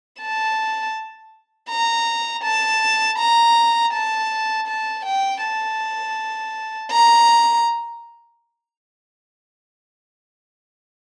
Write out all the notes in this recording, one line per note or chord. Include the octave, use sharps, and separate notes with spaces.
A5
A#5
A5
A#5
A5
A5
G5
A5
A#5